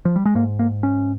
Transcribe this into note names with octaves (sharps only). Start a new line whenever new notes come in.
F3
G3
G#3
G#2 A#3
A#3
C#4